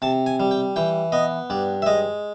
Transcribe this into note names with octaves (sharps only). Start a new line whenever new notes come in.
C3 A5
G#5
G3
G5
E3 G5
B3 D#5
G2 D5
E5
G#3 D#5